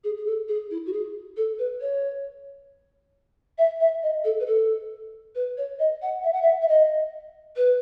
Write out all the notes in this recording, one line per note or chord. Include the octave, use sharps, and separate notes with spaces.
G#4
G#4
A4
G#4
E4
F#4
G#4
A4
B4
C#5
E5
E5
D#5
A4
B4
A4
B4
C#5
D#5
F#5
E5
F#5
E5
E5
D#5
B4